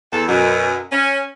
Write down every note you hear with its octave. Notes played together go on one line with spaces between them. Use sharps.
E2 A4
F#2 B2
C#4